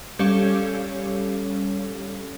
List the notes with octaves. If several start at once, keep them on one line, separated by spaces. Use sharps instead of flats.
G3 C#4 G4 A4 C#5 F5